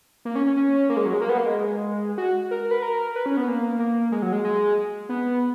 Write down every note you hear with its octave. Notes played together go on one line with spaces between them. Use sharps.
A#3
C#4
C#4
C#4
A#3
G#3
F#3
G#3
A#3
B3
A#3
G#3
F#4
A#4
B4
A#4
B4
C#4
B3
A#3
A#3
G#3
F#3
G#3
G#3
B3